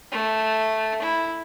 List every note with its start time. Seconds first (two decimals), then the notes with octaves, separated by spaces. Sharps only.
0.12 A3
1.02 E4